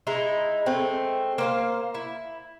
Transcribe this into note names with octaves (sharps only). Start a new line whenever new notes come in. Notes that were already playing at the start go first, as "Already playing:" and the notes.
G#3 D#4 E4
G#3 A3 C4
A#3 C5 F5
E4